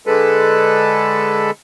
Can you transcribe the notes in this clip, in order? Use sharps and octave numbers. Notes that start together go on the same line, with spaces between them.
D3 G#3 A4 B4